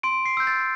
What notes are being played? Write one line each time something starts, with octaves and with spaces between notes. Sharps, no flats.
C6 D7
C7
E6 G6
A6